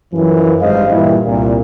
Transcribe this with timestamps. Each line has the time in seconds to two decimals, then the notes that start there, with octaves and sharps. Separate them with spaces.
0.13 F#2 E3 F3
0.61 G#1 G2 G#3 C5 D#5 F5
0.90 G2 A#2 E3 G3 E4
1.25 C2 A#2